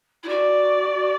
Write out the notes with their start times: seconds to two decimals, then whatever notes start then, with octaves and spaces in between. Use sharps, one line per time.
0.23 E4
0.28 F#4 D5